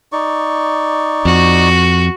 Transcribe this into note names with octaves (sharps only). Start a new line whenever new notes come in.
D#4 D5 C#6
F2 F#4